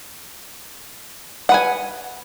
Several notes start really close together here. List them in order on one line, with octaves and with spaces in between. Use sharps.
F#5 B4 G#5